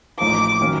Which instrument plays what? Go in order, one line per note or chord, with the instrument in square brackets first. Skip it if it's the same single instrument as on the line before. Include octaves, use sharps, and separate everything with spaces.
[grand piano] A1 A2 F3 A#3 D#4 [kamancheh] D6
[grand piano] D#3 F#3 A#3 C#4